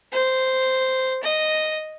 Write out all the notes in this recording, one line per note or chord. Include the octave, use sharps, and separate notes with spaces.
C5
D#5